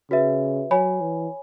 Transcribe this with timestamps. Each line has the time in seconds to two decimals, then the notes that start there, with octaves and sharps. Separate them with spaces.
0.11 C#3 F#4 B4 E5
0.71 F#3 C#5 G#5 B5
1.01 E3